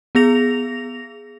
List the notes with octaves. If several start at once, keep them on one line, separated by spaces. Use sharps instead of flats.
B3 G#4 A#6 F7